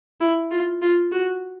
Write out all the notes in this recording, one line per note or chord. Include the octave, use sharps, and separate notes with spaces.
E4
F4
F4
F#4